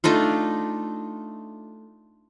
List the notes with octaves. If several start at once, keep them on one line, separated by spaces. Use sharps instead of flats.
A3 D4 D#4 F4